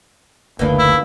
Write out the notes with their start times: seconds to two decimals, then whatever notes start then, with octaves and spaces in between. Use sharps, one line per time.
0.59 F#1 D2 E3 A#3 D4
0.79 E4